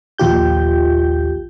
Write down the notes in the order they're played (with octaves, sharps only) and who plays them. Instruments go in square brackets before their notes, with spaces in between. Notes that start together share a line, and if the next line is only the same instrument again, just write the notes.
[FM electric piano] A#1 D#2 F4 G4 G6